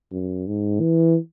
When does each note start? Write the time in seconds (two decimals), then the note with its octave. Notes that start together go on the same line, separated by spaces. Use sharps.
0.12 F#2
0.47 G#2
0.80 E3